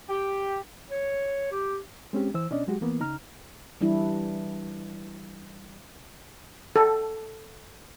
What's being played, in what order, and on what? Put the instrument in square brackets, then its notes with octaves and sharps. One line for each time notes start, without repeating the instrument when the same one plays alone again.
[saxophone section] G4
[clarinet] C#5
G4
[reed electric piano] G#3 C4 C#4 G4
E3 C5 E6
B2 C#4 D4 D5 D#5
F#3 G#3 F#4 G4
E3 A#3 B3
C#3 D#4 A#5 F6
[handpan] E3 G3 D4 E4
[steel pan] A4